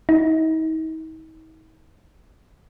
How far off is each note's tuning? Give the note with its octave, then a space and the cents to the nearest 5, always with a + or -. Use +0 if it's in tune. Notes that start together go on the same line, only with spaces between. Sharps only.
D#4 +40